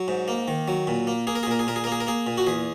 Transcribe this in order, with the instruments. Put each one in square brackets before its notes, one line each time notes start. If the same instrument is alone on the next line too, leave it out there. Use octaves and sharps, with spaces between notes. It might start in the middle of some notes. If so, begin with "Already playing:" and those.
Already playing: [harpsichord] F#3
G#2
A#3
D#3
F#3
A#2
A#3
A#3 G#4
A#4
G#4
A#2 A#4
G#4
A#2 A#4
G#4
A#3 A#4
G#4
A#4
A#3 G#4
A#2
F#4
E2 G#4